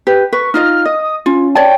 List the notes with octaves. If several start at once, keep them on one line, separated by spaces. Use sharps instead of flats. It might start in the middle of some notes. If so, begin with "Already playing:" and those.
G4 B4
B4 C#6
D#4 F4 D#5 F6
D#5 D#6
C#4 F4
C#5 D5 G5 A5